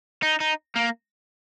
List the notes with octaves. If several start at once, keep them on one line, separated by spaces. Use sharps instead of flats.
D#4
D#4
A#3